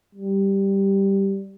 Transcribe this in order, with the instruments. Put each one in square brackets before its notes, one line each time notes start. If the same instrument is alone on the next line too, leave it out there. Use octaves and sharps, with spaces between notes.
[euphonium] G3